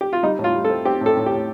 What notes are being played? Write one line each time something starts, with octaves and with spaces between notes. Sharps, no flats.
G4
F4
G3 D#4
A2
F4
G3
A4
C4
C4 G4
A2
A4
A2
G4
A2